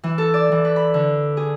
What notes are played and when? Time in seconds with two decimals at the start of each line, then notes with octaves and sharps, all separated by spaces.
0.04 E3
0.18 A4
0.34 D5
0.52 E3
0.65 B4
0.76 B5
0.94 D3
1.37 G#4